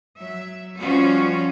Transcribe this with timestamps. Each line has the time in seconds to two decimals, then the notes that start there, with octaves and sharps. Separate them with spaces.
0.18 F#3 E5
0.79 F3 G3 C#4 F4 F#4